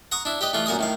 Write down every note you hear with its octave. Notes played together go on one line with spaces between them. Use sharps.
F#5 A#5 C#6 D#6
D4 E4
G4 B4 D#5
E3 A3 F4
F#2 A#2 A#4 G#5 D#6
A2 D#3 F5